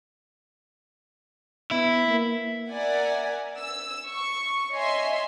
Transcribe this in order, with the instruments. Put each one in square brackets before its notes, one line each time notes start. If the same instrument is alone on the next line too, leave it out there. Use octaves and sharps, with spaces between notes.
[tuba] B3 [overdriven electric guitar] E4
[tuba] A#3
[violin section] A#4 D5 E5 F#5 G#5
E6
C#6
C#5 D#5 E5 G#5 C6